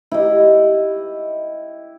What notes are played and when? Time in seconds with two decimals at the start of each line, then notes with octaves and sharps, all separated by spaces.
0.12 E4 G4 D#5